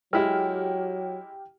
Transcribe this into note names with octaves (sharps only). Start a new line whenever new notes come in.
F#3 G#3 E4 G4 G5 F6